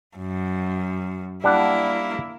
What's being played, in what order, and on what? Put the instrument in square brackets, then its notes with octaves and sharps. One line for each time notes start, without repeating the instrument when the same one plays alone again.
[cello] F#2
[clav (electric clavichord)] G3 D4 F#5 [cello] A#3 E4